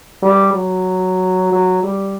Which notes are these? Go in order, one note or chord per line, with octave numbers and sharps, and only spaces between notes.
G3
F#3
F#3
G3